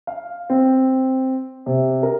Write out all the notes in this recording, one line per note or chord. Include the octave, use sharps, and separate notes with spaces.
F5
C4
C3
A#4